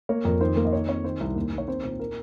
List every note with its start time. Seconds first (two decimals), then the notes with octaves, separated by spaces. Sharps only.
0.09 A#3 C#5
0.25 F2 A#4
0.41 D#3 C5
0.57 A#3
0.65 D#5
0.73 D#3 C#5
0.88 C4 C#5
1.04 D#3 C5
1.20 C2
1.36 D#2
1.52 D#2
1.58 C#5
1.68 C4 C5
1.84 A#2 C5
2.00 A#4